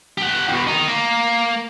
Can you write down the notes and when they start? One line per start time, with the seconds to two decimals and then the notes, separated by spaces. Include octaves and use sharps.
0.18 G4 F#5
0.49 E2 B2
0.67 D#3 D#4
0.88 A#3